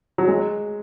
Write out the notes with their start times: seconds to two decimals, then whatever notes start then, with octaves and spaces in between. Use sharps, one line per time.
0.18 F#3
0.28 G#3